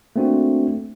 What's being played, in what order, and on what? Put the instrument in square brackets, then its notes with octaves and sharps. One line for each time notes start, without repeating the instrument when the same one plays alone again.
[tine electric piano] A3 A#3 C4 D4 F#4